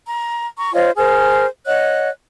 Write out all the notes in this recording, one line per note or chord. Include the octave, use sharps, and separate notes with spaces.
A#5
A#5 C#6
F4 C5 C#5 D#5
G#4 A#4 C5 F6
C#5 D#5 F#5 F#6